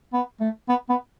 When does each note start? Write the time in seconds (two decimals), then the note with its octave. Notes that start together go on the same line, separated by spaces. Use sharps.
0.13 B3
0.40 A3
0.69 B3
0.89 B3